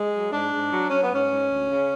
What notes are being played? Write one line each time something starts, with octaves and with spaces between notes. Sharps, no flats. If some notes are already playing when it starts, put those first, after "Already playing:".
Already playing: G#3
F#3
G#2 D4
G#2
F#3
F#3 C#4
B3
G#2 C#4
G#2
D2
C#3